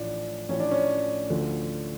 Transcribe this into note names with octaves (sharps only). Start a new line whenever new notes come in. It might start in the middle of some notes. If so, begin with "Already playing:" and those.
Already playing: A1 A2 F3 D4
A1 A2 F3 C#4
D4
C#4
D2 D3 F3